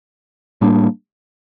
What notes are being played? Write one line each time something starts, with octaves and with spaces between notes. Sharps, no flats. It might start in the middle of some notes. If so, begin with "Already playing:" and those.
A2 G3 A#3 D4